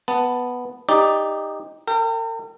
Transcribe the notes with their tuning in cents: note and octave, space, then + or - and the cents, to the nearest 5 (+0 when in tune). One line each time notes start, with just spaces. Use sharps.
B3 +0 A5 +5
D#4 +0 G4 +20 D5 +0
A#4 -45 G5 +0